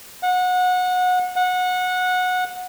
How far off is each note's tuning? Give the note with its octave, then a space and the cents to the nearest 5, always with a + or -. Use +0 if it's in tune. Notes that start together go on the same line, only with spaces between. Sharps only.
F#5 -25
F#5 -20